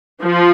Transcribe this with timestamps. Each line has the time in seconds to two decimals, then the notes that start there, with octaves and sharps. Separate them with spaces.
0.22 F3